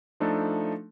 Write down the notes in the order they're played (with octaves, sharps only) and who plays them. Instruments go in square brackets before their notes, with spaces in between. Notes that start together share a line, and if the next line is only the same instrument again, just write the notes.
[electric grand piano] F3 A3 D4 D#4 A4